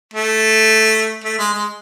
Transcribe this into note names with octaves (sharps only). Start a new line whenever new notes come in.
A3
A3
G#3
G#3